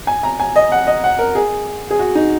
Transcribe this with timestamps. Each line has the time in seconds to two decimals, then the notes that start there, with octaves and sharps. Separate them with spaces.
0.07 G#5
0.23 A#5
0.40 G#5
0.56 D#5
0.72 F#5
0.87 D#5
1.04 F#5
1.19 A#4
1.35 G#4
1.91 G#4
1.99 F#4
2.15 D#4